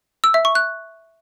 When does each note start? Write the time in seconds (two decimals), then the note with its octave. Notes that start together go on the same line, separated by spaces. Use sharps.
0.24 E6
0.34 E5
0.45 C#6
0.55 F#6